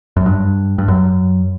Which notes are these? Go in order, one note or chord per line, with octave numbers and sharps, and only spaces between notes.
F#2
G2
G2
F#2